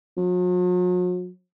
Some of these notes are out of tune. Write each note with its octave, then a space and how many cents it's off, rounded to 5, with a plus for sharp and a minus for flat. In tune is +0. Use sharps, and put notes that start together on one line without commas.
F#3 -45